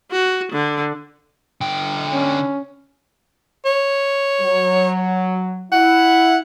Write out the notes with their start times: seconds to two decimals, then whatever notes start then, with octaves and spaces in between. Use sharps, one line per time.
0.11 F#4
0.52 D3
1.61 D3 G5
2.12 C#4
3.65 C#5
4.41 F#3
5.72 E4 F#5